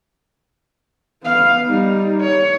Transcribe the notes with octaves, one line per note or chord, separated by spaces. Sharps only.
B3 F5
G3 D#4
C#5